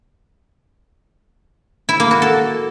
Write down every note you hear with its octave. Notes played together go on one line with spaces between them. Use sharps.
E4
A#3
F#4
A4